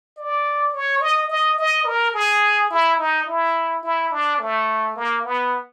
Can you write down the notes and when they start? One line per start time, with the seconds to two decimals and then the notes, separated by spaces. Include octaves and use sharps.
0.17 D5
0.74 C#5
1.01 D#5
1.29 D#5
1.59 D#5
1.86 A#4
2.14 G#4
2.71 E4
2.99 D#4
3.27 E4
3.83 E4
4.12 D4
4.40 A3
4.96 A#3
5.24 B3